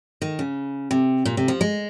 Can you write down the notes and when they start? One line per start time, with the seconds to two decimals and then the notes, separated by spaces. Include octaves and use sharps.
0.22 D#3
0.39 C#3
0.91 C3
1.25 A#2
1.37 C3
1.48 F3
1.61 G#3